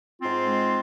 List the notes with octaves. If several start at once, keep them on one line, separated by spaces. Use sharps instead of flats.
G#2 C4 F4
G#3